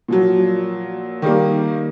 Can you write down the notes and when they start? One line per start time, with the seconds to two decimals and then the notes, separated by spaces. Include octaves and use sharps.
0.08 A#2 F3 F#3
1.22 D#3 G3 A#3